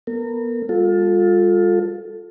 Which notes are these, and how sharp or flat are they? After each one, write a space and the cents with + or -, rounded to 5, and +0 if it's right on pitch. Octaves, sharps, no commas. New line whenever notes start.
B3 -30 A#4 -35
G3 +35 F4 +25 A4 +0